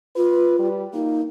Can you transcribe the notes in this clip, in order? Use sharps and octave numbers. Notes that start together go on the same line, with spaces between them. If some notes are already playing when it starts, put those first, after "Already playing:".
F4 B4
G3
A#3 D#4